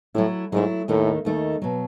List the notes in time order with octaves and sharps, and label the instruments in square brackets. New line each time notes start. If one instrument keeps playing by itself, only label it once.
[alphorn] A2 [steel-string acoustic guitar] F#3 A3 E4
[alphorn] G#2 [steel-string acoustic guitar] F#3 A3 E4
[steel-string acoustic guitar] D#2 D#3 A3 D#4 [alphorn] A2
[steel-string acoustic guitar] D#2 D#3 A3 D#4
B2 F#3